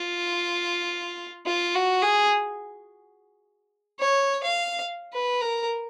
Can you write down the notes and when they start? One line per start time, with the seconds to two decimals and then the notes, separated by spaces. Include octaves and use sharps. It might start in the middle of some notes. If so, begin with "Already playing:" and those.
Already playing: F4
1.46 F4
1.75 F#4
2.02 G#4
3.99 C#5
4.43 F5
5.13 B4
5.41 A#4